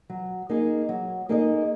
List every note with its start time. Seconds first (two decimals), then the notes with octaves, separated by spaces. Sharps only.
0.10 F#3
0.50 A#3 D#4 G#4 D#5
0.89 F#3
1.29 A#3 D#4 G#4 D#5